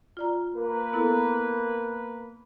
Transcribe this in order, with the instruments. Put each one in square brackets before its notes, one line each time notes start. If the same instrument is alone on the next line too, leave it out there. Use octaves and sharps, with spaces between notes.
[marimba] F4 D5 A#5
[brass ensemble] A#3 A#4 B4
[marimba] B3 E4 A4